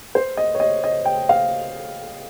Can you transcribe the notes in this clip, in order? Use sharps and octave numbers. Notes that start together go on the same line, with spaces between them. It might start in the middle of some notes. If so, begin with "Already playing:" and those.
C5
D#5
C#5
D#5
D#5
G5
F5